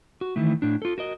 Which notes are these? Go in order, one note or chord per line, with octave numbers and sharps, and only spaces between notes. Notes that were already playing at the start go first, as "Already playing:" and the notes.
F#4
D#3 E3 A3
A2 D4
F4 A4
F#4 A#4 D#5